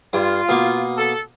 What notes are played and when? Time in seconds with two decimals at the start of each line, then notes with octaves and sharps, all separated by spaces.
0.13 G2 F4
0.49 B2 A#3
0.97 A4